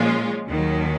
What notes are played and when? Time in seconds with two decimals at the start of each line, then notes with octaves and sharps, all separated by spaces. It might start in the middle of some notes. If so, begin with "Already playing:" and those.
Already playing: A#2 F3 G#3 C#4 F4
0.47 D#2 D#3 F#3